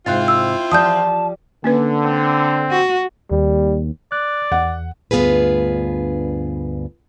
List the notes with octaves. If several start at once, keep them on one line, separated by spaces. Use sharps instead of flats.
G#2 C3 C4 E4 F4 F5 F#6 A6
E6
F3 G3 D5 A5 D#6 G6
D3 A#3 C#4 B4
C4
F#4
D#2 G3
D5 F#6
E2 F#5
D2 G2 B3 F4 G#4 B4